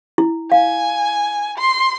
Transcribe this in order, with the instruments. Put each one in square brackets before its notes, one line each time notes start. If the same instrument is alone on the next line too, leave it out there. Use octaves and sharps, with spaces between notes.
[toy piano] E4
[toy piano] F5 [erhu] G#5
[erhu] C6